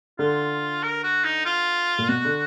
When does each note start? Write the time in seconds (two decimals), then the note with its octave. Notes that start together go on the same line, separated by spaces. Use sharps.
0.19 D3 F4
0.83 A#4
1.03 F#4
1.24 D#4
1.46 F4
1.99 A#2
2.09 B2 F#4
2.25 D3